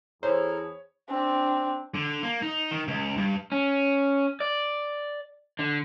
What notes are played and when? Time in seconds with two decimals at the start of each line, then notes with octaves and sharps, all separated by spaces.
0.23 E2 E4 G#4 A4 C5 C#5 A#5 F6
1.10 C4 D4
1.95 D3
2.23 A#3
2.42 D#4
2.71 D#3
2.88 C#2
3.17 G2
3.52 C#4
4.40 D5
5.59 D3